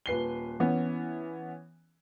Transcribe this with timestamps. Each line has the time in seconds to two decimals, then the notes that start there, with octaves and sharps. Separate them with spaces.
0.06 D#1 B4 C7 G7
0.60 E3 B3 C#4